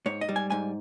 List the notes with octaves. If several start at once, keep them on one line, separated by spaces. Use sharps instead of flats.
G#2 C#5
D#5
G3
G#5
G#2 G#5